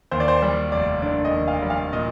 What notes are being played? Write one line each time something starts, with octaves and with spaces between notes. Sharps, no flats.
D#2 C5
D5
C5
G3 C5
F1 D5
D3 D5
D#5
D#2
F5
G3
F5
A#2 D#5